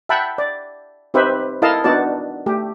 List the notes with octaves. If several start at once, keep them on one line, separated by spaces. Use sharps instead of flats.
E5 F#5 G5 A5 B5
D5
C4 D#4 G4 B4 C5 E5
E4 A4 A#4 D#5 F5 A5
B3 D4 D#4 F#4 D5 A5
A3 G4